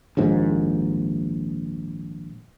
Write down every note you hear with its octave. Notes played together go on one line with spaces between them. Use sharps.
A#1 D#2 G#2